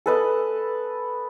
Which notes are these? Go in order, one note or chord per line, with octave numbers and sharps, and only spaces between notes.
A4 B4 D#5